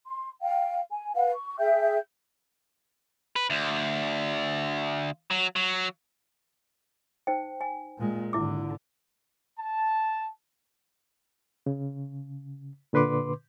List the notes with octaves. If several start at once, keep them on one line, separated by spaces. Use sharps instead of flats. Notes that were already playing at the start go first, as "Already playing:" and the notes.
C6
F5 G5
G#5
B4 F5 F#5
C#6
G#4 E5 G5 G6
B4
D2
F#3
F#3
D#4 C5 G5
G#5
A#2 G#3
G#1 D3 E4 D6
A5
C#3
A#2 D3 B4 C6 D6